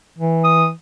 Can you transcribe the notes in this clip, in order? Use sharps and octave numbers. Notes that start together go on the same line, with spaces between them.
E3
D#6